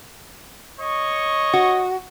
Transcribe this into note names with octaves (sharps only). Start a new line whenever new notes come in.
C#5 D#5 C#6
F#4